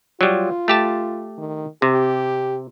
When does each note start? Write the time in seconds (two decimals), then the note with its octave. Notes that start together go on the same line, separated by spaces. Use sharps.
0.21 F#3 G3 F4
0.68 A3 G4 A5
1.38 D#3
1.82 C3 G4